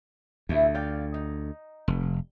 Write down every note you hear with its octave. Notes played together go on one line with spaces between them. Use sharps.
D2 A2 C3 E4
D5 F5 G5
D#4
F1